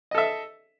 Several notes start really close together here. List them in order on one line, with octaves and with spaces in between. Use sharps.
D#5 A4 E5